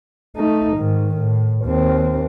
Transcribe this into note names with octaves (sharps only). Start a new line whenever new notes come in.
A3 D#4
G#2 D#3
A2
D#2 C4